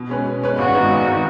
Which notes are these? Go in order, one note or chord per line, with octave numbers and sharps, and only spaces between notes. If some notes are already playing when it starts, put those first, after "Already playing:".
Already playing: B2
G#3 C#4 B4
B2
G#3 C#4 B4
G#1 F#4
G#2 D#3 B3 D#4
G#1
D#3 B3 D#4